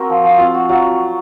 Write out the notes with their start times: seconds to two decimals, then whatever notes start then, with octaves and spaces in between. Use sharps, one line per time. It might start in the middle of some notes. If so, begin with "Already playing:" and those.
Already playing: C4 F#4 A#4
0.09 F3
0.24 F3
0.38 C4 F4
0.54 F#4
0.69 F#3 F4